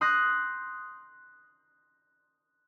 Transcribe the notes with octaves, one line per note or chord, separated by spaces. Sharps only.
C6 D#6 F#6 G6 A#6